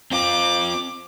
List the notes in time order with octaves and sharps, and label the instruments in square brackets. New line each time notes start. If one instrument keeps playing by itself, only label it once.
[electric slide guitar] C4 F4 [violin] D6